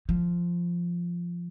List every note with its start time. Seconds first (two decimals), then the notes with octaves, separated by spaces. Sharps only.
0.09 F3